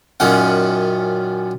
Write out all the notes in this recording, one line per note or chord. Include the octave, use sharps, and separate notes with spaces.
F#2 A#2 D#3 C#4 F#5